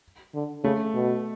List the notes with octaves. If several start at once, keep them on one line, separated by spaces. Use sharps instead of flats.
D3
C#3 A3
B2